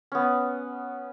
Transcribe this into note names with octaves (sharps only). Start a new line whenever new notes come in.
B3 C#4